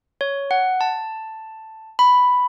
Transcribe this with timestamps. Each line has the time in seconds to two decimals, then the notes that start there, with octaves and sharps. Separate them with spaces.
0.21 C#5
0.51 F#5
0.81 A5
1.99 B5